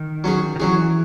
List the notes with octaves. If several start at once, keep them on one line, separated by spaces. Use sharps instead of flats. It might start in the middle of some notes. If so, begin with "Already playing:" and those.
Already playing: D#3
F#3 C#4 G#4
D#3
E3 F#3 C#4 G#4